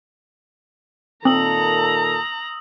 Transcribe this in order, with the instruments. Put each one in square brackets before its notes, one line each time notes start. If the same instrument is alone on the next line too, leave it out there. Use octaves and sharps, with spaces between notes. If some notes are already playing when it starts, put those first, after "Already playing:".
[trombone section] A#2 D#3 A4 [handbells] C4 [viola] A#5 [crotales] D#6 E6 F#7